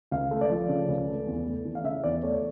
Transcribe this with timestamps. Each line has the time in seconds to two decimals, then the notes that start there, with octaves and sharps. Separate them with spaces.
0.11 C#2 F5
0.31 A3
0.41 D5
0.50 F3
0.69 C#3
0.88 C#2
1.08 A3
1.27 E2
1.45 A3
1.65 E3
1.75 F5
1.84 C#3 E5
2.04 E2 D5
2.23 A3 C#5
2.33 C#5